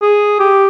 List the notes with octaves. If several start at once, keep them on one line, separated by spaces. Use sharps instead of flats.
G#4
G4